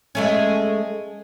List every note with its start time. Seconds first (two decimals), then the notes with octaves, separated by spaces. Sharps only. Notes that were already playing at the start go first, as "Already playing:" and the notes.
0.15 G#3 A3 C#4